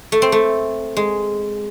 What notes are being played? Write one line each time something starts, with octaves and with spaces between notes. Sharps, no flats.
A3
C4
A3
G#3